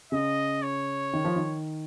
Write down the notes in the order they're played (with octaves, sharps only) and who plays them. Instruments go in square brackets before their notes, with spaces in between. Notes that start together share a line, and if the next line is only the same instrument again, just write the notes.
[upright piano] C#3 [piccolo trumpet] D#5
[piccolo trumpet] C#5
[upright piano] D#3
F3
D#3